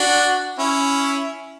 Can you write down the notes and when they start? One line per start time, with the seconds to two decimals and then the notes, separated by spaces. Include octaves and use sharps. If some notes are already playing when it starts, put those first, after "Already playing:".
Already playing: D4 F#4
0.58 C#4 E4